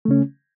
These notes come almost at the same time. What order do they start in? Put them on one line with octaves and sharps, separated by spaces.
A3 C#3 C#4